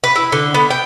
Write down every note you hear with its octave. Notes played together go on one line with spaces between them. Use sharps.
B4
E4
D3
B3
G5